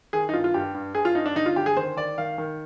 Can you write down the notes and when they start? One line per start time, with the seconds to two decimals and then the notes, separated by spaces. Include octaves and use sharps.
0.13 D#3 G#4
0.29 D#4
0.33 G2 F4
0.44 F4
0.54 G2 G4
0.74 G2
0.95 G2 G#4
1.05 F4
1.15 G2 D#4
1.26 D4
1.36 D3 D#4
1.46 F4
1.56 D3 G4
1.66 G#4
1.77 D#3 C5
1.97 D#3 D5
2.18 D#3 F5
2.38 D#3